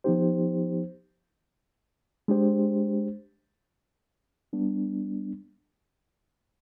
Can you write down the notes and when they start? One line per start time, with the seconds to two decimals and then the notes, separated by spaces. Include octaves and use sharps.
0.04 F3 B3 D#4 G4 C5
2.28 G#3 D4 G4 C5
4.53 G3 B3 D4